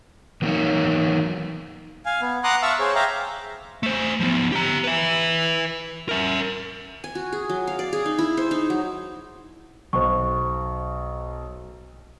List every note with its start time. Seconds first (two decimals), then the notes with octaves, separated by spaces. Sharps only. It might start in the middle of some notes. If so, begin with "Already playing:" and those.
0.42 E3 F#3 A#3 D#4 A#4 C#5
2.06 F5 G#5
2.21 B3
2.44 F#5 A#5 C6 D6 D#6 F#6
2.62 E5 F5 A5 C#6 E6
2.79 G#4 C5 C#5
2.95 E5 F5 G5 A#5 D6
3.83 A3 C5
4.20 F3 B3
4.52 G4 A#5
4.84 B4 E5
6.09 A#4 E5
7.04 G#5
7.15 F#4
7.33 G#4
7.49 F#3
7.67 F5
7.79 D5
7.93 G#4
8.06 D#4
8.19 E4
8.37 C5
8.51 D#4
8.70 F#3
9.93 B1 C5 C#6